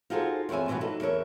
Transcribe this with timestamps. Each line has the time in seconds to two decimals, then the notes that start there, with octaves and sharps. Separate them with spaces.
0.10 D#4 F4 F#4 G#4 A4 C5
0.49 E2 C4 C#5 E5 G#5
0.68 B2 E3 F#3 G3 B3
0.81 F#3 D#4 A4 B4
1.01 E2 A#4 C#5 E5